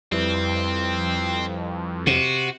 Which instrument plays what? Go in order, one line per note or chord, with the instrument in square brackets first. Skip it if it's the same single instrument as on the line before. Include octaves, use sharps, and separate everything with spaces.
[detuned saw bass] F2 [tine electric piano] G3 E4 B4 [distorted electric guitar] C4
[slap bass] C3 [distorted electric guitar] F#4